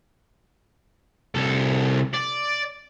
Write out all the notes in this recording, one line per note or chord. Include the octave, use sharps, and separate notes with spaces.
C2 A4
D5